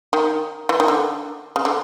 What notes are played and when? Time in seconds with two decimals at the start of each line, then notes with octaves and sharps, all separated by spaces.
0.13 D#3
0.69 E3
0.80 D#3
0.88 D3
1.56 C#3
1.65 D3